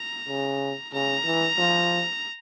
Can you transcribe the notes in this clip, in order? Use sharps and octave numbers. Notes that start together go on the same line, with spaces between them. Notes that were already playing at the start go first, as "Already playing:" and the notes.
Already playing: A#5
C#3
C#3 A#5
E3
F3